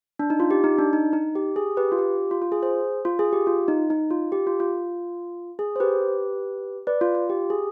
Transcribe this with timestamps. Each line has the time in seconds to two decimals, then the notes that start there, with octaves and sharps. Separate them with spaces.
0.19 D4
0.30 D#4
0.40 F4
0.51 G4
0.64 D#4
0.79 D4
0.93 D#4
1.13 D#4
1.36 G4
1.56 G#4
1.77 G4 B4
1.92 F4
1.98 G4
2.31 F4
2.42 F4
2.52 G#4
2.63 G#4 C5
3.05 F4
3.19 G#4
3.33 G4
3.47 F4
3.68 D#4
3.90 D#4
4.10 F4
4.32 G4
4.47 F4
4.60 F4
5.59 G#4
5.76 C5
5.80 G4 B4
6.87 B4 D5
7.01 F4
7.15 F4
7.29 G4
7.50 G#4